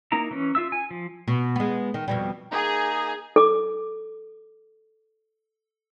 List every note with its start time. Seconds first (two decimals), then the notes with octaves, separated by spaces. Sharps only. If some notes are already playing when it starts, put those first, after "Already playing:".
0.12 A#3 D#4 E4 A#5
0.31 E3 C#4
0.55 F4 E5 E6
0.72 G#5
0.91 F3
1.28 B2
1.56 G#3 B3
1.94 D#3
2.08 F2 B2 G3
2.51 A#3 D#4 G#4 A#5
3.36 A4 D6